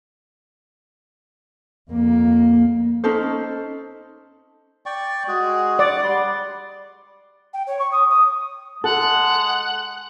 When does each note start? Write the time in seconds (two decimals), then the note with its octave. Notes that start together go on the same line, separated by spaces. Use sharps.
1.91 F2 A#3
3.04 C#4 D#4 A4 C5
4.86 D5 G5 C#6
5.28 G#3 F#4 G#4
5.79 D5 F#5
6.03 G3 C6
7.53 G5
7.67 C#5
7.79 C#6
7.92 D#6
8.10 D#6
8.84 G#3 A4 F#5